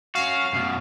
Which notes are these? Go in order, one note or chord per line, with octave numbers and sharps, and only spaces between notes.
C#4 F#4 F5
F#2 B2